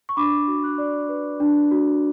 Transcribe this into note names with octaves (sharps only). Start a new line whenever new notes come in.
C#6
D4 B5 D6
F#4
D6 F#6
D5
B4
D4
F#4